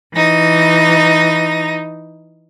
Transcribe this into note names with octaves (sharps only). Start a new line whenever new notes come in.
E3 D#4 A#6